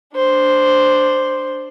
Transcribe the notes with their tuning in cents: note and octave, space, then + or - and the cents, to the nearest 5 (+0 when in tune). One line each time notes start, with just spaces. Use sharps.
D4 +0 C5 +0